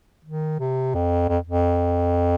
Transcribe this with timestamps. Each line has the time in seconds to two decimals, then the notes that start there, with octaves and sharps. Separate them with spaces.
0.24 D#3
0.59 C3
0.94 F2
1.28 F2
1.47 F2